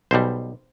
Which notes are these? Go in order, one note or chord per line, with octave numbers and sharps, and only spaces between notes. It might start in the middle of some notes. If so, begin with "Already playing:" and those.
B1 B2 G3 C5